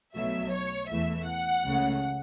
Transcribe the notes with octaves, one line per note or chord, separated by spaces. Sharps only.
B1 B2 F#3 A3 E5
C#5
E2 E3 A3 E5
F#5
C#2 C#3 A3